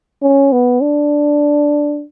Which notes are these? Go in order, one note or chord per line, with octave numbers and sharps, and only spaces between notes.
C#4
B3
D4